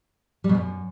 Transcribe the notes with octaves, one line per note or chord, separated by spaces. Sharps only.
G3
B2
F#2